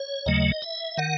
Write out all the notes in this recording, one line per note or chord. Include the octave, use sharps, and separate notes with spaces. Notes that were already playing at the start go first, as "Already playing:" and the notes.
Already playing: C#5
D#2 C#3 F#3 A3 D#5
E5
D#3 F#5